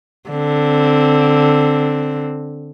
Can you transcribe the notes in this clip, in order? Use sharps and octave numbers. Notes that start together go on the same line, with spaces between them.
D3 C4